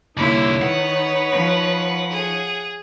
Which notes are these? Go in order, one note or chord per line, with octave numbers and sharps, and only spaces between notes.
C2 D3 A#3 D#4 E4 C#5
D#3 B4 F#5
F3
G#4